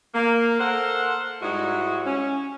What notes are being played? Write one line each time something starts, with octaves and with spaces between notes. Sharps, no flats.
A#3
A4 A#4 C5 F#5
G#2 G3 G#3 D#4 E4 F#4
C#4